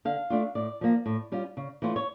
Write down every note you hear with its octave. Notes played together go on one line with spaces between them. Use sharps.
D3 F5
A3 D4 F4
A2 D5
F3 A#3
A2
G3 C#4 F4
C#3
E3 A3 C#4 F4
C#5